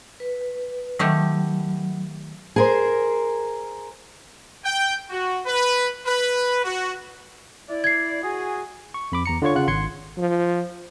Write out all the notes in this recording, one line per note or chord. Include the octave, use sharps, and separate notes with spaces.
B4
D#3 F#3 A3 G4
G#4 A#4 C5
G5
F#4
B4
B4
F#4
E4 D5
G#6 C7
F#4 G#4 G#5
C#6
F2 B5 D6
E2 A#5 C#7
D3 F4 C#5 C#6
C#3 F4 F#5 F#6
G#1 C6 G#6 C#7
F3